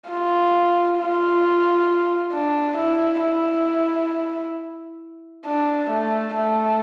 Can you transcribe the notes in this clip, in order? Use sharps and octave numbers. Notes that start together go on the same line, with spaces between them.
F4
F4
D4
E4
E4
D4
A3
A3